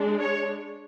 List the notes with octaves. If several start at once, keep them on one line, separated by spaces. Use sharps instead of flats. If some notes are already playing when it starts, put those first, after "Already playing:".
Already playing: G#3 D4
C#5